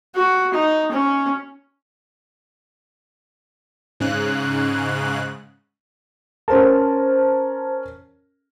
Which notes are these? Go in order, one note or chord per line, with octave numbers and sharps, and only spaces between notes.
F#4
D#4
C#4
G#2 C#3 F#6
C#4 A#4 C5 A5